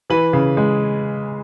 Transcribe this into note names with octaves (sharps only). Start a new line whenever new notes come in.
E3 B4
C#3
G#3